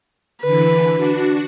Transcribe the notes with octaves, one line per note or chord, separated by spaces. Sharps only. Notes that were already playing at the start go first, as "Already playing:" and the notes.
D3 E3 B4
D4 F#4